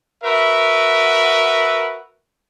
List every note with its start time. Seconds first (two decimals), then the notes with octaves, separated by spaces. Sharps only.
0.24 F#4 A#4 B4 E5